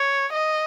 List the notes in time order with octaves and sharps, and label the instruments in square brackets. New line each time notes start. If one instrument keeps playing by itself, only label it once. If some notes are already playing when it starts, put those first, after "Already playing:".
Already playing: [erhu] C#5
D#5